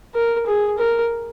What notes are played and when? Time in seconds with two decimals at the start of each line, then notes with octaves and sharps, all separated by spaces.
0.14 A#4
0.46 G#4
0.78 A#4